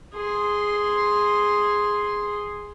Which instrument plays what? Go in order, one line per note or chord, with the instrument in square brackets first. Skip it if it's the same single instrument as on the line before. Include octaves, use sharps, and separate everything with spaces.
[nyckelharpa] G#4 C6